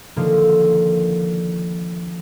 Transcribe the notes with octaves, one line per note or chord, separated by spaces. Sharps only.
D3 D#3 F3 A#3